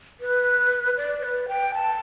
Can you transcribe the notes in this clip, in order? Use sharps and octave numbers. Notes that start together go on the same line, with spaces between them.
B4
D5
B4
G5
A5